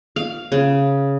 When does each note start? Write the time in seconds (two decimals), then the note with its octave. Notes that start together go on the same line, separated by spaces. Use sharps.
0.16 F5
0.52 C#3